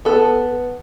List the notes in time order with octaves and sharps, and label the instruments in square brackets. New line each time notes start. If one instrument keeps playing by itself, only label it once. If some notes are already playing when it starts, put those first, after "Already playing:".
[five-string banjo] B3 A4